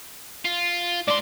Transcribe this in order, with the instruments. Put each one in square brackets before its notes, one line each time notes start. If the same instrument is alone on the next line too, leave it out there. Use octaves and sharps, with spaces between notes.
[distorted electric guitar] F4
[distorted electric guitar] G#2 C6 [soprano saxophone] D5